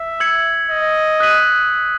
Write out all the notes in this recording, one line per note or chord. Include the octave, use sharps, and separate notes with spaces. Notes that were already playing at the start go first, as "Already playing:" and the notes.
Already playing: E5
E6 G#6 C#7 F#7
D#5
D#6 F#6 B6 D#7 F#7